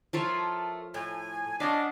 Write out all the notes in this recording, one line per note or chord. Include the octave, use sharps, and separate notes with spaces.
F3 A3 F4 A#4 C#5
A2 G#5
C#4 D4 D#5 F5 F#5 A5